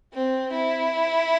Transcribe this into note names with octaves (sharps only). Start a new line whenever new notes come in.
C4
E4